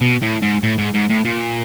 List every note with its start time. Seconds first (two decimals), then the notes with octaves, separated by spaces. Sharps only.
0.02 B2
0.22 A2
0.42 G#2
0.63 A2
0.78 G#2
0.94 G#2
1.10 A2
1.25 A#2